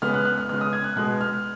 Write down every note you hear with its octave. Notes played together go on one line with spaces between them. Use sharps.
C#3 G#3 B3 F6
F#6
F#6
F6
C#3 G#3 B3 F6
D#6
G#6
F#6
B2 G#3 B3 F#6
F6